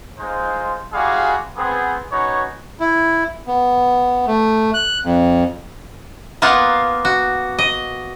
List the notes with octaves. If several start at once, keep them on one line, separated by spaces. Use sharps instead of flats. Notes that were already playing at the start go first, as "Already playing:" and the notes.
G#3 D#4 F4 C5
G3 G#3 E4 F#4 G#4 F5
B3 C4 G#4
C#4 D#4 F#4 B4 C#5
E4
B3
A3
F#6
F2
A#3 B3 F4 F5 F#5
F#4
D#5